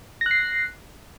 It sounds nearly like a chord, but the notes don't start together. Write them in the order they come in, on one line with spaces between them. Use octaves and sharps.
A#6 F#6 C7